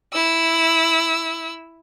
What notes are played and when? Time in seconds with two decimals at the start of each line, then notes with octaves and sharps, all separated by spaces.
0.13 E4 E6